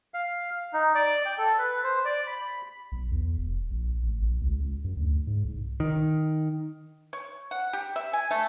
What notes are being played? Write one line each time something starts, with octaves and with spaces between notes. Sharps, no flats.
F5
D#4
D5
G5
A4
B4
C5
D5
B5
B1
E2
E1
A#1
A1
A#1
C#2
C#2
F#2
D2
G#2
C2
D#3
C#5
F#5
G4
E5
G#5
A3